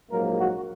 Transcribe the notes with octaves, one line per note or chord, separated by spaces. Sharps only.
A#1 G#2 F#3 A#3 A#4
F#4